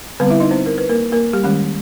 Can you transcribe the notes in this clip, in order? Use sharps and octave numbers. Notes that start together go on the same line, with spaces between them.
D3 G3 B3 C4 B4
E4 E5
D#4 D#5
C4 C5
A#4
B4
A#3 A#4
A#3 A#4
G3 G4
D#3 G3 G#3 C#4 G4